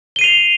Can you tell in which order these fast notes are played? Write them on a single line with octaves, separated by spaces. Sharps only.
G7 D#7 C7 F7